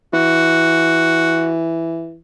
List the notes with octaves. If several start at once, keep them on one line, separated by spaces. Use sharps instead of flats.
E3 F#4